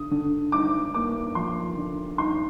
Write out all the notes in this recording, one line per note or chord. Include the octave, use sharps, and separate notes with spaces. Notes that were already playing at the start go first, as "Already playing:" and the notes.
Already playing: D3 D#6
D3
D#4 D6
A#3 D6
F3 C6
D3
D#4 C6